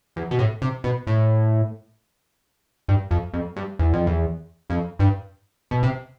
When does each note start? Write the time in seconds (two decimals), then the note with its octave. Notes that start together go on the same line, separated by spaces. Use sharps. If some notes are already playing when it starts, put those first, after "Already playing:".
0.16 E2
0.31 B2
0.39 A2
0.62 C3
0.84 B2
1.07 A2
2.88 G2
3.11 F2
3.33 F2
3.56 G2
3.79 E2
3.93 F2
4.06 E2
4.70 F2
4.99 G2
5.71 B2
5.83 C3